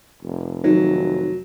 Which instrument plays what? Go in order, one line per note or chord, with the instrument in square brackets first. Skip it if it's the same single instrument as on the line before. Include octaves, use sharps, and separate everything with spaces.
[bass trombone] F1
[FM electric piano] D#3 [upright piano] F#3